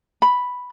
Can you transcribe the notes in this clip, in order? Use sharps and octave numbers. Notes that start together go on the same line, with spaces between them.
B5